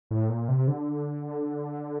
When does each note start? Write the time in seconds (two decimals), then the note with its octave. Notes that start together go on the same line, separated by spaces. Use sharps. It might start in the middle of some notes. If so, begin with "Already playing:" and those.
0.11 A2
0.30 A#2
0.48 C3
0.68 D3